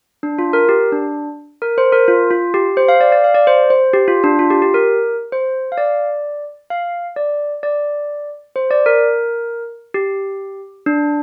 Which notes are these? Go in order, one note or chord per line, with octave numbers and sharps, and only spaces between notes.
D4
F4
A#4
G4
D4
A#4
C5
A#4
F4
F4
G4
C5
F5
D5
D5
F5
D5
C5
C5
G4
F4
D4
F4
G4
G4
A#4
C5
F5
D5
F5
D5
D5
C5
D5
A#4
G4
D4